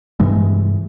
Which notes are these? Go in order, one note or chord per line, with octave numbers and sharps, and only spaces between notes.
G2 C3 E3 G#3